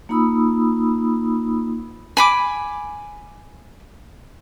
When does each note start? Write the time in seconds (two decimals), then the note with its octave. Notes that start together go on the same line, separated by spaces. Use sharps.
0.09 A#3 D#4 F4 B5 D#6 E6
2.17 G#5 B5 D6